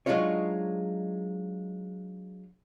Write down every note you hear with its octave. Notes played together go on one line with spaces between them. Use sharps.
F#3 G#3 D4 D#4 F4 C#5